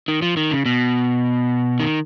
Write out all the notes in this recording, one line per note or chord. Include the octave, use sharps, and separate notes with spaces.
D#3
F3
D#3
C#3
B2
D#3